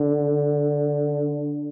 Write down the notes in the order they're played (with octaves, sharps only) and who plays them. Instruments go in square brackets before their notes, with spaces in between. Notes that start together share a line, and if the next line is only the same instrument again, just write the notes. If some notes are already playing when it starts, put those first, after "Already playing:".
Already playing: [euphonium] D3